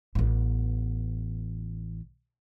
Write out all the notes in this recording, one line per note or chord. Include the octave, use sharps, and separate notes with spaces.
A1 B3